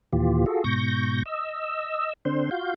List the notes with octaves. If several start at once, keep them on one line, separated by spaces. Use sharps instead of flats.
D#2 A#2 E3 F4 G4
F4 F#4 G#4 A4
G#2 B2 C#6 G6 A#6
D#5 E6
D3 C4 D4 C5 C6
F4 F#4 F5 G6